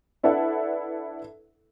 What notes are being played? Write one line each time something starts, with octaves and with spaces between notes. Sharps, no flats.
D4 E4 A4 B4 E5 F#5